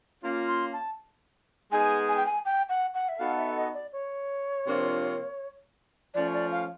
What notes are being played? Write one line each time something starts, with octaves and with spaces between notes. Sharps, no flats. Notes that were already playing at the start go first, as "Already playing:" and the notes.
A#3 C#4 F4
C6
A5
G#3 B3 D#4 G#4 G#5
G#5
G5
G#5
G5
F#5
F#5
E5
B3 D#4 F#4 A4 F5
E5
D#5
D5
C#5
C3 F3 A#3 D4 F4
F3 A3 C#4 D5
D5
F5